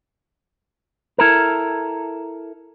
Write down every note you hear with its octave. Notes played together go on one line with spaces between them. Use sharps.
E4 A4 A#4